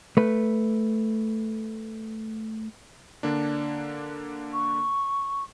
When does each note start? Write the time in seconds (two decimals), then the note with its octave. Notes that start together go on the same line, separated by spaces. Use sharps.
0.17 A3 B4
3.23 D3 A#3 D4
4.53 C#6